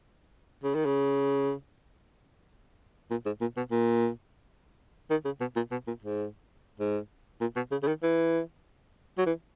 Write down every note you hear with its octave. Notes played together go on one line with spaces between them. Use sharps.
C#3
D#3
C#3
A#2
G#2
A#2
B2
A#2
D#3
C#3
B2
A#2
B2
A#2
G#2
G#2
A#2
B2
C#3
C#3
D#3
E3
F#3
E3